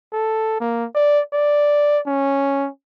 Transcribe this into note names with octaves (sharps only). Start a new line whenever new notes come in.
A4
A#3
D5
D5
C#4